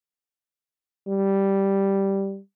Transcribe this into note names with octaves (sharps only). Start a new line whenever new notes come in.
G3